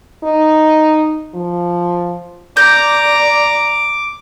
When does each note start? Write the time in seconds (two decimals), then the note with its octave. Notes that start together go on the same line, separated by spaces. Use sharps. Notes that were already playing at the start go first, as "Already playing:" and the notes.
0.23 D#4
1.35 F3
2.57 D5 A#5 D6 G6